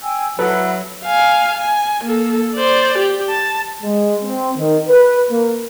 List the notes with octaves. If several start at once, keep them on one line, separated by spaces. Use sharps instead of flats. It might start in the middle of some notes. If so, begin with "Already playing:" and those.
G5 G#5 E6
F#3 E4 A4 B4 F#5 B5
F5 G#5
G#5
A#3 A4
C5 D5
G4
A5
G#3
C4
D#3
B4
A#3